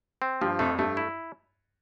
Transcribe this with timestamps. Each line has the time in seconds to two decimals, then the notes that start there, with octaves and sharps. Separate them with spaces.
0.22 C4
0.41 G2 F3
0.59 F2 A3
0.78 G2 A3
0.97 E4